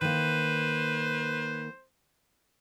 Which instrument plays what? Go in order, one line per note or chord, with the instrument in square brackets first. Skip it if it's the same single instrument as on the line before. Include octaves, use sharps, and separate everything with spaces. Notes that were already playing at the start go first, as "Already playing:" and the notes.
[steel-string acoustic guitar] D#3 A#3 [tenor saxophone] B4 [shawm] C5